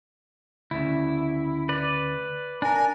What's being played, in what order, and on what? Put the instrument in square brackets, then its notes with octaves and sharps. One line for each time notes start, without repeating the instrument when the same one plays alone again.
[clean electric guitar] D2 A2 C#3 [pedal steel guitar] E4
[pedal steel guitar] B4 D5
[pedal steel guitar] D4 A#4 [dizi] G#5